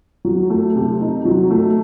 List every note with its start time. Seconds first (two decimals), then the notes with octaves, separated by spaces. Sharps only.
0.25 F#3
0.50 A3
0.76 C3
1.01 D#4
1.25 F#3
1.51 A3